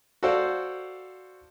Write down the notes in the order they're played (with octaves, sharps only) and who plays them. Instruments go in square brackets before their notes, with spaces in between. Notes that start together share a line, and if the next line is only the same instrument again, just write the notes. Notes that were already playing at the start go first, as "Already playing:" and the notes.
[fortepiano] F#4 A4 C5 D5 F5